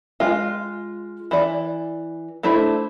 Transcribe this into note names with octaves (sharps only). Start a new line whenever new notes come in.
G#3 F4
E3 D5
A3 D4 E4 C5